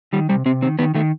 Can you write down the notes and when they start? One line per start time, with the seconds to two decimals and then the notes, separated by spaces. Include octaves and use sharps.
0.13 D#3 G3
0.29 C3 G3
0.46 C3 C4
0.62 D#3 C4
0.79 D#3 B3
0.95 D#3 A3